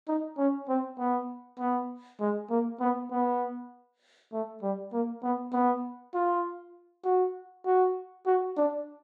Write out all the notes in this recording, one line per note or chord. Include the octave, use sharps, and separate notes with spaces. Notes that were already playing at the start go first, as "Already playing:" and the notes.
D#4
C#4
C4
B3
B3
G#3
A#3
B3
B3
A3
G3
A#3
B3
B3
F4
F#4
F#4
F#4
D4